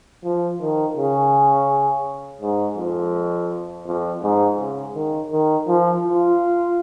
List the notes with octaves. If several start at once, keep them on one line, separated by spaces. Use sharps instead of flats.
F3
D#3
C#3
G#2
F2
F2
G#2
C#3
D#3
D#3
F3
F4